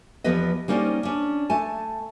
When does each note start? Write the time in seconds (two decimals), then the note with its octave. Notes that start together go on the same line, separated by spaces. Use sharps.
0.24 E2 F3 B3 G4 B4 D#5
0.68 G3 A#3 C#4 D#4 C5 D5
1.03 C#4 D4
1.50 A3 G#5 A5